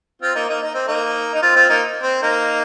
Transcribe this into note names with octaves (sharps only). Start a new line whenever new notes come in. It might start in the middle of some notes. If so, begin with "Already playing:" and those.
C4 F4
A#3 D#4
A#3 D#4
D#4
C4
A#3 D#4
D#4
C4 F4
C4 F4
A#3 D#4
C4
A#3 D#4